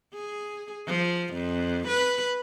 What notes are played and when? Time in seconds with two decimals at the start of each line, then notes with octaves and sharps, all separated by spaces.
0.14 G#4
0.87 F3
1.33 F2
1.87 B4